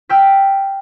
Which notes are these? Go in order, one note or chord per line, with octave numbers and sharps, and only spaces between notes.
G5 E6 F6 B6